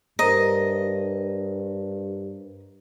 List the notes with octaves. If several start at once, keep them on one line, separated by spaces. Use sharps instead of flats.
G2 A#4 C5 D#5 A#5